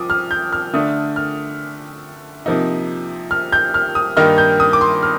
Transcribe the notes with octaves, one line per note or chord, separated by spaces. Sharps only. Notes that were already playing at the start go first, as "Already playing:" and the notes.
Already playing: F3 D6 D#6
F6
G6
F6
D3 A3 D4 D#6
F6
C3 F3 A#3 D#4
F6
G6
F6
D#6
G2 D#3 A#3 D#4 F6
G6
D#6
D6
C6
F6